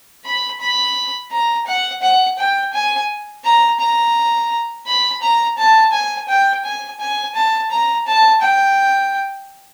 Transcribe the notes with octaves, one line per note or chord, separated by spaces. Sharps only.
B5
B5
A#5
F#5
F#5
G5
G#5
A#5
A#5
B5
A#5
A5
G#5
G5
G#5
G#5
A5
A#5
A5
G5